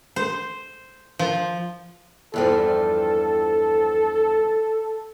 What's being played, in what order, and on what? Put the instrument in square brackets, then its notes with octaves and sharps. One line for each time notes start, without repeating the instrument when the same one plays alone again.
[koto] C5
F3
[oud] E2 G2 F3 [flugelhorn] A4